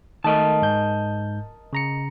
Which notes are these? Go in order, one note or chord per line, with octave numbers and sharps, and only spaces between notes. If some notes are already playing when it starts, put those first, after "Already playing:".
D#3 A3 A#4 D#5 A5
G#2 G6
C#3 A#5 C#7